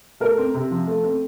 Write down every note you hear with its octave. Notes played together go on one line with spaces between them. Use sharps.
A3 A#4
C4
C3
F3
A3
C4